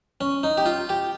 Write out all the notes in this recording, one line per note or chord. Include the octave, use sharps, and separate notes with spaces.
C#4
D#4
G4
F4
G4